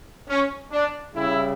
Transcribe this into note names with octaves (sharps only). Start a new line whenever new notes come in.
C#4
D4
C#3 G3 E4